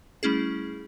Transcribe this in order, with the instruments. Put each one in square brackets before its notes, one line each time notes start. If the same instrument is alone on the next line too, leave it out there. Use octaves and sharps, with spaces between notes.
[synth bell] G3 A3 C#4 E4 G#4